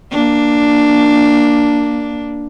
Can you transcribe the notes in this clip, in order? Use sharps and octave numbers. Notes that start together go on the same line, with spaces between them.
A#3 D4